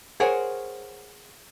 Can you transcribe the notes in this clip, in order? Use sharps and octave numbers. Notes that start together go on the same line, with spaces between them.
G#4 A#4 C5 C#5 F#5 G5